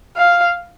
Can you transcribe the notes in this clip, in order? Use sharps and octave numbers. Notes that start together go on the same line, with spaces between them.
F5